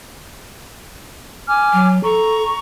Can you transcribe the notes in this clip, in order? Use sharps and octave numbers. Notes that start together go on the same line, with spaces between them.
G#5 D6 F6
F#3
A4 A#5 C#6